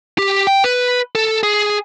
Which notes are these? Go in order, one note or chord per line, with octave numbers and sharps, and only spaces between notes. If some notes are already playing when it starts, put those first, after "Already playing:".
G4
G5
B4
A4
G#4